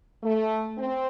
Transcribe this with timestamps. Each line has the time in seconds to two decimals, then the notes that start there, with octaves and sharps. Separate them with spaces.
0.23 A3
0.78 C4